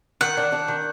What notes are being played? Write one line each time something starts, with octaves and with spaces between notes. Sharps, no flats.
D#3 F#5
D4
D4
D#3